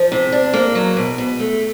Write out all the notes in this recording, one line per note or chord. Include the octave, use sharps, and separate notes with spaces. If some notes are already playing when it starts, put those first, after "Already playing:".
Already playing: F3
C3
D4
A#3
F#3
B2
B2
A3